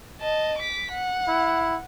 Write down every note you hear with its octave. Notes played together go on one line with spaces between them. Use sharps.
D#5 A5
D6 B6
F#5
E4